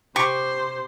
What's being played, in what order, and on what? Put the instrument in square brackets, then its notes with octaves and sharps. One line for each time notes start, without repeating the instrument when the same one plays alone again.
[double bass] C3 [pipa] G4 C#6 [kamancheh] C5